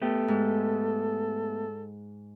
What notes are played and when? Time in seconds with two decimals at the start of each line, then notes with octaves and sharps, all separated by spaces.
0.02 A3 B3 G4 A4
0.28 G#2